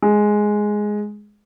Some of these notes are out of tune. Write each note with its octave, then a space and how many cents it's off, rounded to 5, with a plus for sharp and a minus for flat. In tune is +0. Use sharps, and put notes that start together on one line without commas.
G#3 +5